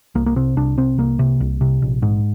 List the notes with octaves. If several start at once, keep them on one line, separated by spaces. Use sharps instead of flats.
C2 A#3
A#3
C3 C4
C2 D4
C3 C4
C2 A#3
C3
C2
C3
A#1
G#2